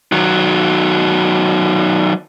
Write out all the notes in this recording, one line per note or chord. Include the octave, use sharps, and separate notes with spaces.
D#3 F#3